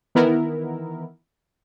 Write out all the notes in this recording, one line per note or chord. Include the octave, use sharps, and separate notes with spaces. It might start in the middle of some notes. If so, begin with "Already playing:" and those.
D#3 E3 B3 E4 A#4